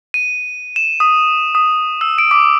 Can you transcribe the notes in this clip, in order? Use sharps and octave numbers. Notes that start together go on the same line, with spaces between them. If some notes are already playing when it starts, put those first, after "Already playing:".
D#7
E7
D#6
D#6
E6
D7
D6